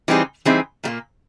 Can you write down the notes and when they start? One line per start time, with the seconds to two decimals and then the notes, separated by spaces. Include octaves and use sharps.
0.08 E3 G3 C4 D#4 G#4
0.45 E3 G3 C4 D#4 G#4
0.84 A#2 G3 A#3